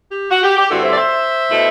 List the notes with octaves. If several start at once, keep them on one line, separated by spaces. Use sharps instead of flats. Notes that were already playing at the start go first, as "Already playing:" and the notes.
G4
F#4
G4
G4
G2 D3 A3 C4 E4 F#4 A4
C5 E5
D5
C5 E5
B2 A3 E4